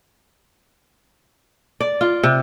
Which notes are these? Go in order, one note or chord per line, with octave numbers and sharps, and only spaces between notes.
D5
F4
C3